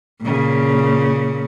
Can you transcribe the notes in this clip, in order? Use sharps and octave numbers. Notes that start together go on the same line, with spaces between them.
A#2 C#3